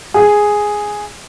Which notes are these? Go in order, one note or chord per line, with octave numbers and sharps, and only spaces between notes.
G#4